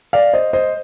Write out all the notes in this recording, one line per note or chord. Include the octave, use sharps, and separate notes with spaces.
D5 F5
C5 D#5
C5 D#5